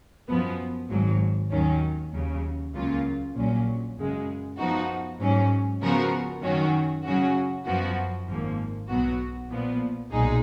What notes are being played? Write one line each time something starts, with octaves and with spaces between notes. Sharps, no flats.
F#2 F3 B3
G#1 G#2 F#3
D#2 D#3 F#3 C#4
D#2 C#3 F#3
C#2 C#3 F#3 A#3 F4
A#1 A#2 F#3 C#4
F#2 C#3 G#3
F#2 F3 B3 D#4 F#4
G#2 F#3 C#4
C#3 F3 B3 F#4 A#4
F#2 D#3 F#3 C#4 F#4
C#3 F#3 C#4 F#4
F#2 F3 B3 F#4
G#1 G#2 F3 A#3
B1 B2 F#3 B3 F#4
A#2 F3 B3
B1 A#2 G#3 D#4 G#4